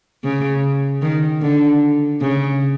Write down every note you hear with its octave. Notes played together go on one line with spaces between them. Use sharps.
C#3
D#3
D3
C#3